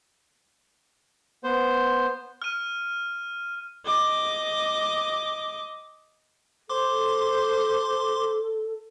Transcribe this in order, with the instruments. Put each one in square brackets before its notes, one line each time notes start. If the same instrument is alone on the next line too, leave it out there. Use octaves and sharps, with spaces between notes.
[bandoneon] B3 C5
[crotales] F6 D#7
[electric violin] D#5 D6
[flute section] A4 [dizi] C5 [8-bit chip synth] C6 D6